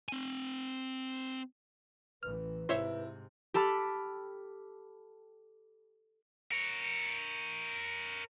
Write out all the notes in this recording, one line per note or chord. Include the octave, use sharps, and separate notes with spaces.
C4 G#5
A1 E3 B4 F6
G#2 C3 E4 C5 C#5 E5
G4 A4 A5 B5 F6
A#4 C#5